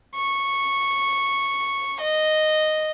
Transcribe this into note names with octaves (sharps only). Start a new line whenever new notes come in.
C#6
D#5